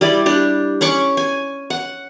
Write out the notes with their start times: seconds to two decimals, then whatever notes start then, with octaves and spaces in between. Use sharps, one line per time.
0.01 G3 E4 D5
0.26 D4 G4
0.81 C#4 B5 C#6 D6
1.17 G#5
1.70 F#5